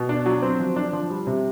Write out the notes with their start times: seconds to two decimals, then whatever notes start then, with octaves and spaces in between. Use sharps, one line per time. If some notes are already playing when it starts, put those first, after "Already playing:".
Already playing: B2
0.09 D4
0.26 F#3
0.42 C4
0.59 F3
0.76 D4
0.93 F3
1.10 G3
1.27 C3